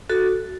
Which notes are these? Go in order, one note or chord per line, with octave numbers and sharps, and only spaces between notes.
F#4 A4